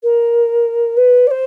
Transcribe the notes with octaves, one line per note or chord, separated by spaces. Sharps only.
A#4
B4
D5
C5